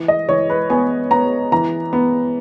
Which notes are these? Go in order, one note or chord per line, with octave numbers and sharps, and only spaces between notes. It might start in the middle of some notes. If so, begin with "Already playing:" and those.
Already playing: E3
D#5
E3 C#5
B4
B3 G#5
B3 A#5
E3 A#5
B3